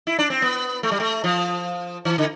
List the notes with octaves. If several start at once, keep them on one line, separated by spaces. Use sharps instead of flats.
E4
D4
C4
B3
A3
G3
A3
F3
E3
D3